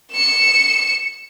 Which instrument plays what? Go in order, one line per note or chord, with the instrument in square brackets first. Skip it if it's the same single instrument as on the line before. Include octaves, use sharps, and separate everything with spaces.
[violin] C#7 E7